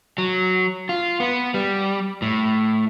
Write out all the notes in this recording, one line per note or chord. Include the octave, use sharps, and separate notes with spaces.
F#3
F4
B3
G3
A2